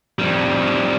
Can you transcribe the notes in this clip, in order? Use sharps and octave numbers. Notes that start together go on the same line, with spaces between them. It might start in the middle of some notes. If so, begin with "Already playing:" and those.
F2 G3